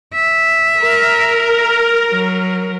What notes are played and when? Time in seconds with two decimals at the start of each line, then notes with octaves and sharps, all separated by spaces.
0.14 E5
0.81 A#4
2.10 F#3